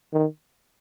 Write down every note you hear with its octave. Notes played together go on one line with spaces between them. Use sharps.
D#3